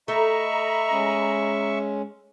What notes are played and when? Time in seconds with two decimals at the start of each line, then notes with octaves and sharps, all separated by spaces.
0.08 A3 D#5 E5 A#5 B5 C#6
0.90 G#3 C#4